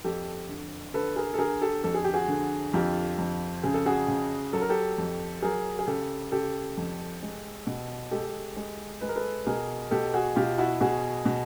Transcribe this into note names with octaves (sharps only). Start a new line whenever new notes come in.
F2 G4 A4
D3
D3 A4 B4
G#4 A#4
A4
D3 G#4 A#4
G4 A4
F2 A4
G#4
G4
F#4 G#4
D3
F2 F4 G4
F2
C#3 G#4
A4
F#4 G#4
C#3
F#3 A4
A#4
G4 A4
F2
F#3 G#4 A#4
G#4
C#3 G4 A4
C#3 G4 A4
F2
G#3
B2
G#3 G4 A4
G#3
G#3 B4
A#4
A4 B4
B2 G#4 A#4
B2 G4 A4
F#4 G#4
B2 F4 G4
E4 F#4
B2 F#4 G#4
B2